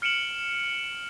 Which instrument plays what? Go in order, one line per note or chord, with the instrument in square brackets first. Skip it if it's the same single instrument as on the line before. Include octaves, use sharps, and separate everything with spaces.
[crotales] F6 C#7 D7 E7 F#7